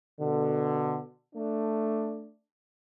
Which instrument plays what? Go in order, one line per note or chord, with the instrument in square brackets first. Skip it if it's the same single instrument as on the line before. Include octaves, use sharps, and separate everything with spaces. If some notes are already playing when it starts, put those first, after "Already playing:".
[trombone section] B2 D3
A3 D4